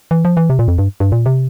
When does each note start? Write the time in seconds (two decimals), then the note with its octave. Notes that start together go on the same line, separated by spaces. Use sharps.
0.11 E3
0.25 F3
0.37 E3
0.50 C3
0.59 A#2
0.68 F2
0.78 G2
1.00 G2
1.12 A#2
1.26 C3